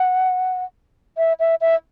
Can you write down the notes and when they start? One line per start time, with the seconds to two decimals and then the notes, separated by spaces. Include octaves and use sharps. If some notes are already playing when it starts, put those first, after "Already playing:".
Already playing: F#5
1.18 E5
1.40 E5
1.61 E5